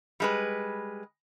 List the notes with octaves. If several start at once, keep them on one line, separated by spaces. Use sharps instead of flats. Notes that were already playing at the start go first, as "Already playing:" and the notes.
G3 G#3 B4